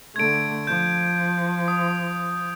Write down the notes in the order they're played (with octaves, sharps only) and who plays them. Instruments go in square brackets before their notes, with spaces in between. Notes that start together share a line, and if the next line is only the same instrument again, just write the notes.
[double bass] D3 A3 [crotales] G#6 D7
[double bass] F3 [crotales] G6
[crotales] D#6